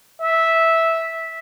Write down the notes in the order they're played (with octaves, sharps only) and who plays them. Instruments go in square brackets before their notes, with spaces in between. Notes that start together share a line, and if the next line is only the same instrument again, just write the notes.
[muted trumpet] E5